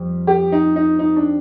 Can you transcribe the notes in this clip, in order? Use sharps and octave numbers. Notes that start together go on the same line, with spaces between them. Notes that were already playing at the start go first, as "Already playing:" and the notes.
Already playing: F2 G3
G4
D#4
D#4
D#4
D4